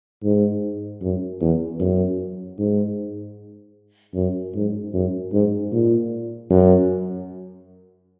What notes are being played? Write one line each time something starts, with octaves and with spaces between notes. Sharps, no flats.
G#2
F#2
E2
F#2
G#2
F#2
G#2
F#2
G#2
A#2
F#2